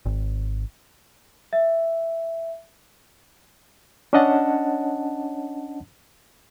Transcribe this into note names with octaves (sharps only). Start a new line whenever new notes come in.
G#1
E5
C#4 D4 C#5 D#5 F#5 A5